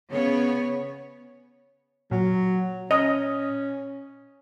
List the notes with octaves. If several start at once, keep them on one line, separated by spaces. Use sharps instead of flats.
C#3 B3 C#5
A#2 F#3
C#4 D#5